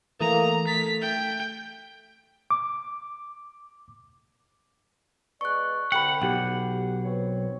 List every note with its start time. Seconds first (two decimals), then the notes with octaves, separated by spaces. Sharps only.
0.20 E3 A3 A#3 A#5 D#6
0.67 A3 A6 B6
1.01 G5
2.51 D6
5.41 G#3 B3 D5 C#6 F#6
5.92 C2 D3 F#5 G5 B5
6.22 B1 G4 F#5
7.04 C4 B4 C#5